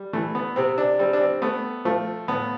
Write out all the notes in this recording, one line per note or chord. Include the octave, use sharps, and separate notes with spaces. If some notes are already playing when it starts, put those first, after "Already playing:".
Already playing: G3
E3 A3
B3
C3 C4
D4
G3 C4
D4
C4
A3 B3
F3 A3
A2 B3